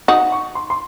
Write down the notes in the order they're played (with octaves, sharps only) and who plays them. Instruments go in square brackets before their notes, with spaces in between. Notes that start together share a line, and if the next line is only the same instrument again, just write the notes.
[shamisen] D#4 F#4 [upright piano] D#6
[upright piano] C#6
C6
C6